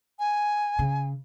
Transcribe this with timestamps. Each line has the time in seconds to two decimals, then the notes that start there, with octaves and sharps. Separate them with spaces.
0.19 G#5
0.79 C#3